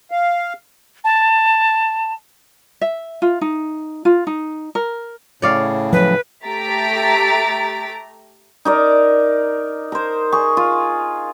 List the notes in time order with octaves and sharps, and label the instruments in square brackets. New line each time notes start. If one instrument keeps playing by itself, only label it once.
[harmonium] F5
[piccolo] A5
[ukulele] E5
F4
D#4
F4
D#4
A#4
[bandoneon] A2 C#3 [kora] C#5 D5 F5
[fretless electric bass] F3 F#3 [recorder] B4
[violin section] A3 G4 A#5 A6 B6 D7
[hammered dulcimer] D#4 A#4 D5
A#4 C5
G#4 C#6
F4